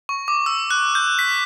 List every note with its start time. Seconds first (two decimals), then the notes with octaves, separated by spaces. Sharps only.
0.09 C#6
0.28 D6
0.46 E6
0.71 F#6
0.95 G6
1.19 B6